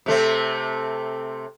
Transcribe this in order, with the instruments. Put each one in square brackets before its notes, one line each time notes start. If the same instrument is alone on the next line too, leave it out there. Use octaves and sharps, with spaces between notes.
[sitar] C3 A3 C4